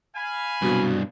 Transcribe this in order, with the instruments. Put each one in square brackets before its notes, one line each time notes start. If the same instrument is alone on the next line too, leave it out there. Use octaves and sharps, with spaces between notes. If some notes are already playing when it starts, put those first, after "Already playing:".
[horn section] F5 G#5 B5
[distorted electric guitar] C2 G2 [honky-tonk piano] B2 F#3